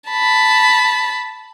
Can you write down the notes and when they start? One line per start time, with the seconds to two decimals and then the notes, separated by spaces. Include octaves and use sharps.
0.10 A5 B5